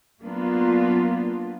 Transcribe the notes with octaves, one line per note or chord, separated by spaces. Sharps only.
F#3 A#3 B3 D4 F4